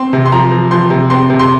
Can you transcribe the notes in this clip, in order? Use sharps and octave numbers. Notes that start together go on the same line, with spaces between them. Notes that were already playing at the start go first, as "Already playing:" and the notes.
Already playing: C4 C6
C3
C6
F3 A#5
F3
F3 C6
C3
C4 C6
C3
C6